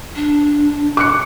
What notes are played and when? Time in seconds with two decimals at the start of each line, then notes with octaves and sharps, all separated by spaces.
0.16 D4
0.97 D6 F#6 C#7